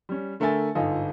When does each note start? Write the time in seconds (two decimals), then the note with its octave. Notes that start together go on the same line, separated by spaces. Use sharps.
0.09 G3 C#4
0.40 D3 A3 A#4 E5 G#5 A6
0.75 G1 G#2 F4 A4 D#5 G#5